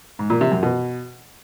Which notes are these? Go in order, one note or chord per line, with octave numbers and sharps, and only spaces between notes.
G#2
A#2
C3
F#2
B2